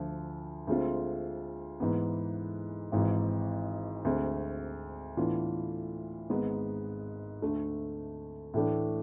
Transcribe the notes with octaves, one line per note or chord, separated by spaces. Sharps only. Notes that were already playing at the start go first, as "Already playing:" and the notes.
Already playing: D2 D3 F3 F4
D2 D3 G#3 C4 F4
G#2 E3 B3
G#1 G#2 E3
D2 D3 G#3 C4
A2 E3 B3 D4 F4
G#1 G#2 G#3 B3
D2 D3 A3
A2 E3 A3 D4